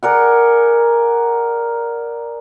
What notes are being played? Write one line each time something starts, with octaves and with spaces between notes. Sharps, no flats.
G#4 A#4 D5 F#5